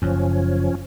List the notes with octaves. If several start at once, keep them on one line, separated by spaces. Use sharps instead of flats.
F#1 F#2 F3 C#4